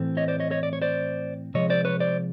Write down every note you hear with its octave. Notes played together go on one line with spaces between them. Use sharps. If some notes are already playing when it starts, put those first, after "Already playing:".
Already playing: A2 E3 A3 C4
C#5 D#5
C5 D5
C#5 D#5
C#5 D#5
D5
C#5
C5 D5
C3 F3 G#3 C#5 D#5
C5 D5
B4 C#5
C5 D5